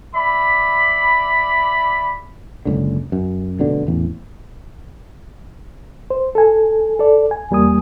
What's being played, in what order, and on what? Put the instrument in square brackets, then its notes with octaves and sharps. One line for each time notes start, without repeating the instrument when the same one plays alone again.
[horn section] D5 E5 B5
[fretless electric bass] F#1 C#2 D3
F#2
F1 B2 D3 D4
A1 E2
[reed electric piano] C5
A4 G#5
A4 D5
G#5
E2 G3 A#3 G#5 D#6